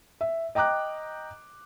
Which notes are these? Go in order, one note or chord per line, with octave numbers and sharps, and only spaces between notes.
E5
D#5 G5 A#5 D6 F#6